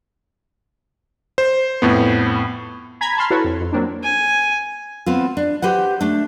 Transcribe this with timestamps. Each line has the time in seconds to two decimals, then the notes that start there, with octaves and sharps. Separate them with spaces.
1.38 C5
1.82 F2 A2 B3
3.01 G#5 A#5 B5 G#6 B6
3.17 A5 B5 C6 F6
3.30 E4 F#4 A4 B4 C#5
3.44 F2
3.61 F2
3.73 F#3 A#3 C4 D4
4.03 G#5
5.06 B3 C4 F4
5.37 D4
5.62 G4 B4 C5 F#5
6.01 A3 D4